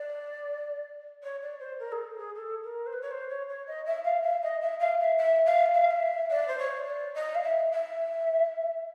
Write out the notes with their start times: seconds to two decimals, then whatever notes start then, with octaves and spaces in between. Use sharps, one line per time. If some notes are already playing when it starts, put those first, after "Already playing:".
Already playing: D5
1.23 C#5
1.42 D5
1.59 C5
1.79 A#4
1.92 G#4
1.97 A4
2.17 G#4
2.35 A4
2.64 A#4
2.86 C5
2.92 B4
3.01 C#5
3.10 C5
3.29 C#5
3.48 C#5
3.67 D#5
3.86 E5
4.04 F5
4.23 E5
4.42 D#5
4.61 E5
4.79 F5
4.99 E5
5.18 E5
5.45 F5
5.74 E5
5.82 F5
5.90 E5
6.30 D5
6.48 C5
6.58 C#5
6.87 D5
7.14 D#5
7.34 F5
7.42 E5
7.71 E5